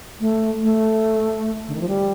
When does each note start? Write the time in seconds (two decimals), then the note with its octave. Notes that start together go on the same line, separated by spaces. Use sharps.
0.20 A3
0.62 A3
1.68 D3
1.75 D#3
1.81 F3
1.88 G3